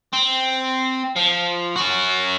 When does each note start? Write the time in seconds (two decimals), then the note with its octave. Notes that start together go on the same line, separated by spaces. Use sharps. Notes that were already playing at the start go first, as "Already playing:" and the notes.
0.13 C4
1.17 F3
1.76 C#4 F#4